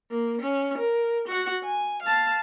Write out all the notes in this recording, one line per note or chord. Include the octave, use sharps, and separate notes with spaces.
A#3
C#4
A#4
F#4 F#5
G#5
F5 A5